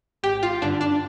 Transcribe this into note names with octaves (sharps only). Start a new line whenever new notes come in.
G#1 G4
F4
G2 D3 D4
D4